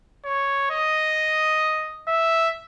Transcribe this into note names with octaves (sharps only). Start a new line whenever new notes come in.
C#5
D#5
E5